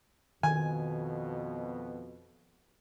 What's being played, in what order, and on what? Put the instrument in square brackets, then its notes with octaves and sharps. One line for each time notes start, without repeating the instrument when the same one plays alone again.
[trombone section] F2 B2 [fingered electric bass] D#3 [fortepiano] G#5